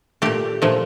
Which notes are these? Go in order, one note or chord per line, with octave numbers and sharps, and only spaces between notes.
A#2 A3 G4
A#2 F3 A3